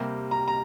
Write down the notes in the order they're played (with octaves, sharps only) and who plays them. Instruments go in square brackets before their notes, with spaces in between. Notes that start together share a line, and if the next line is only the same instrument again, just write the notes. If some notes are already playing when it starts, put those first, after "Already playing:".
Already playing: [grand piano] C3 G3 A#3
A#5
A#5